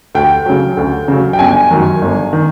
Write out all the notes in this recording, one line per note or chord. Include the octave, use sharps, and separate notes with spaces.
D2 G5
C#3 F#3
D2
C#3 F#3
G5
G1 G#5
F#2 D#3
G1
D#3